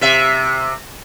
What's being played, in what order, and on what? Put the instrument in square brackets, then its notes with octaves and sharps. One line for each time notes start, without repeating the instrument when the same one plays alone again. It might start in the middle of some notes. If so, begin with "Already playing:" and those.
[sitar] C3 E5